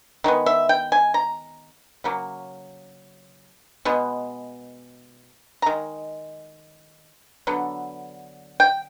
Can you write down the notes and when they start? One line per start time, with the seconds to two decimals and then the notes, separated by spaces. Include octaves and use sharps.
0.24 D#3 G#3 B3
0.46 E5
0.69 G5
0.92 G#5
1.14 A#5
2.04 C#3 F#3 A#3
3.85 B2 G#3 B3
5.62 A#5
5.66 D#3 G#3
7.47 D3 F#3 B3
8.60 G5